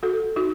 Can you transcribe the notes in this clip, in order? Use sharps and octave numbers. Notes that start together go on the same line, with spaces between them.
F#4 A4
D#4 F#4